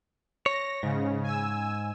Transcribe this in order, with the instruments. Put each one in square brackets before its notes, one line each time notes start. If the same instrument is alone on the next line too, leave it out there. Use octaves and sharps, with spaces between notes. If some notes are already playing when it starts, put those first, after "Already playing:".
[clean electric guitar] C#5 [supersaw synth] A#6
[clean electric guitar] G#2 [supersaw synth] C#3
[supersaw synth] G#5 E6